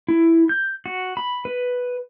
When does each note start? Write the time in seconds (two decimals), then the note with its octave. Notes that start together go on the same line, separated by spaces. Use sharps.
0.08 E4
0.49 G6
0.86 F#4
1.17 B5
1.45 B4